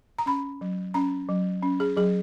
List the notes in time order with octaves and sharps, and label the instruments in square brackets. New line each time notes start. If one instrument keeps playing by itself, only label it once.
[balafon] A#5
C#4 B5
F#3
C#4 A#5
F#3
C#4
G#4
F#3 G#4